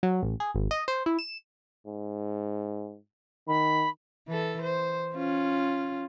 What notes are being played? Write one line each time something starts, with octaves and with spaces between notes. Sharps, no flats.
F#3
A1
G#4
G#1
D#5
C5
E4
E7
G#2
D#3 B5
E3 A4
C5
C#4 F4